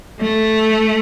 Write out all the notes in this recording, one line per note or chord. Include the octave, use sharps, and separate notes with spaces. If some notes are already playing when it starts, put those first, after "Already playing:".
A3